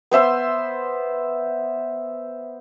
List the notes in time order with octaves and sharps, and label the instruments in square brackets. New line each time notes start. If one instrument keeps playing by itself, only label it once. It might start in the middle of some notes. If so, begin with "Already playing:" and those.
[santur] B3 C5 E5 C6